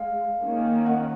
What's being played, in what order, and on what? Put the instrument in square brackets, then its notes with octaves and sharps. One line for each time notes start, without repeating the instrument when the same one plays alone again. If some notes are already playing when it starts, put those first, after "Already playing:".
Already playing: [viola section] G#3 [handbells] F5
[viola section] D#3 A#3 C#4
[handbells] F#5